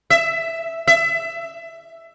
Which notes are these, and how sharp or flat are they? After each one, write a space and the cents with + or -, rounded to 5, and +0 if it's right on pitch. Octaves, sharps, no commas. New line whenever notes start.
E5 +0
E5 +10